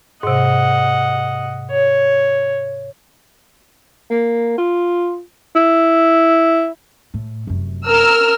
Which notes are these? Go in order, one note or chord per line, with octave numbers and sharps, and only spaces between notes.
G#2 C3 D#5 F#5
C#5
A#3
F4
E4
A2
F1 F#2
A#4 E6 F6